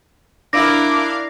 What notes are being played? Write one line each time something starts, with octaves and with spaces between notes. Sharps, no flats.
D4 E4 A#4 F5 D6 A#6